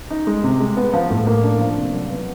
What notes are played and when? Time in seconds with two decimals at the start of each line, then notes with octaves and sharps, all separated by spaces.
0.10 D#4
0.27 G#3
0.44 C3
0.60 G#3
0.77 B3
0.93 F3
1.10 A2
1.27 A#3
1.43 D4
1.60 F3
1.77 C3
1.93 F#3
2.10 B3